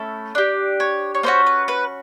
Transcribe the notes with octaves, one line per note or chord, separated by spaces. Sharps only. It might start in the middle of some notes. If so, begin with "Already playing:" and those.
Already playing: A3 C#4 E4 A4
D4 G4
C#5
C#5
A#3 C#4 F#4 C5
B4
B4